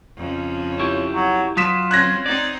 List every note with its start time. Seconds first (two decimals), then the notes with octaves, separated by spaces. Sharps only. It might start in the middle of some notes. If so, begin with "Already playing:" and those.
0.17 F2 C#3
0.80 E4 G4 C#5
1.15 F#3
1.57 F#3 F4 D#6 B6 E7
1.91 C4 C#4 F#6 G#6 A#6
2.26 C4 D#4 D5